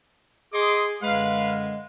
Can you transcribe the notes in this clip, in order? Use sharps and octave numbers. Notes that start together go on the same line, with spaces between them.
G#4 D#5 C6 D6
F#2 D3 G#3 B4 F5